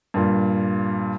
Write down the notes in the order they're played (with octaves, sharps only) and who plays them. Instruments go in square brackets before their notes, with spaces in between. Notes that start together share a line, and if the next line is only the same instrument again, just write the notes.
[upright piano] G2 A#2